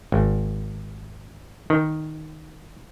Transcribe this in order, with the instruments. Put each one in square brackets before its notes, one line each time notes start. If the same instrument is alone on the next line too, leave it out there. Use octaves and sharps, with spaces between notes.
[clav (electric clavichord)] G#1
D#3